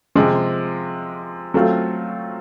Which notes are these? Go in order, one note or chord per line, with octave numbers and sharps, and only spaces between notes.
C3 F3 G#3
F#3 A3 C4 F4